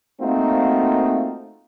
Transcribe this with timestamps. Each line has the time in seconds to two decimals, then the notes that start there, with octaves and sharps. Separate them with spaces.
0.21 A3 A#3 C4 D#4 F4 F#4